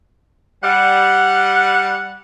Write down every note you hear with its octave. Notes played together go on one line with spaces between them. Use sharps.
G3 F#5